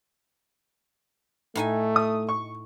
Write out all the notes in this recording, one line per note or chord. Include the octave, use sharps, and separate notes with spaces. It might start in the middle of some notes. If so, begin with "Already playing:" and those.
A2 A3 D#4 G#5
D#6
C#6